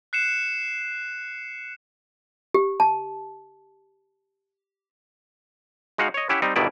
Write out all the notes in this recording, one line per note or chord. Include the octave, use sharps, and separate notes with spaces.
F#6 C7 C#7 E7
G4
A5
G#3 D#4 F#4 F5 F#5
C#5 D#5
C#4 E4 G4 E5 F#5
G3 C4 D#4
G1 G2 B2 D#3 E4 D5